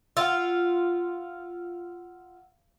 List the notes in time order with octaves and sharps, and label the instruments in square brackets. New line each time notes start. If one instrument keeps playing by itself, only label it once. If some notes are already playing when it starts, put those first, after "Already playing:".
[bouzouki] F4 [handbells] F#5 E6